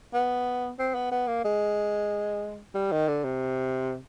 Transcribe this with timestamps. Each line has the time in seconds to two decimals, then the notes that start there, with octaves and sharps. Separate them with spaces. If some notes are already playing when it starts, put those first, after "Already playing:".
0.14 B3
0.79 C4
0.95 B3
1.12 B3
1.28 A#3
1.44 G#3
2.75 G3
2.92 D#3
3.08 D3
3.24 C3